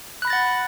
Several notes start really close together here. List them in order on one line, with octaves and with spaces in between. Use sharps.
F#6 B5 A#6 A6 F#5